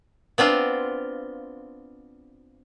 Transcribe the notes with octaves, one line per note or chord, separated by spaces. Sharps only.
B3 C4 D4 F4